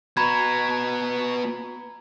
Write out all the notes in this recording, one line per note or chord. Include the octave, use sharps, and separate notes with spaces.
B3 F#4 A#5 B5 G#6